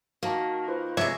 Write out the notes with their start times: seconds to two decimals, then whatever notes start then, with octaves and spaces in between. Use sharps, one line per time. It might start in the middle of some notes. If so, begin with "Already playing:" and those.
0.23 D#3 A#3 F#4 A5
0.68 F4 B4 C5
0.97 C3 G#3 C#5 E5